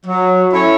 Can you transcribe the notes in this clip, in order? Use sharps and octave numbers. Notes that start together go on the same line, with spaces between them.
F#3
C#4 E4 A4 C#5